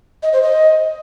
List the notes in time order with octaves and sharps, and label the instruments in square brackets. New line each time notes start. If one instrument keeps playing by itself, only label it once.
[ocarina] D#5
C5
D#5